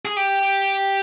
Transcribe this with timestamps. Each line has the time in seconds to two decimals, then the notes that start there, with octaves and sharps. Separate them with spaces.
0.05 G#4
0.17 G4